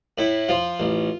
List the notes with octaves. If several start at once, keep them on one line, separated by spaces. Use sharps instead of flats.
A2 E4
F3 F4
A1